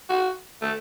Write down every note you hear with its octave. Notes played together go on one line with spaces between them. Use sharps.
F#4
A3